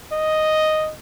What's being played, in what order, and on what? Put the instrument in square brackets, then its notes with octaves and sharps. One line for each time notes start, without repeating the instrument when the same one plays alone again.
[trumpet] D#5